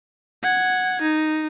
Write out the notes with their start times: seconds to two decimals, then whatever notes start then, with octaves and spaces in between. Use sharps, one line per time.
0.43 F#5 G#6
1.02 D#4